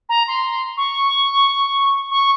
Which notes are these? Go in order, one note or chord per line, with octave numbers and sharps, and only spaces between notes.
A#5
C6
C#6
C#6